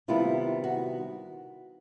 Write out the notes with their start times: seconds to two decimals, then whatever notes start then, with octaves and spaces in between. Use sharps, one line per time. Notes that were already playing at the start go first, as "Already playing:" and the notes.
0.08 C3 D#3 G3 B3 E4 F4
0.64 F#4